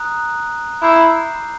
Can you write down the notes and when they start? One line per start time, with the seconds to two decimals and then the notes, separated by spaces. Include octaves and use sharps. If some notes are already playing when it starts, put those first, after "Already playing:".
Already playing: A#5 D#6 F#6
0.82 E4 A#5 D6 G6 C7